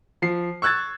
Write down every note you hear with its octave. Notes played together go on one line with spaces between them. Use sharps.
F3 C7
C#6 E6 F#6 G#6 A6